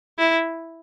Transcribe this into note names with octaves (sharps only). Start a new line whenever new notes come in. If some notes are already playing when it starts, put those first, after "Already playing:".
E4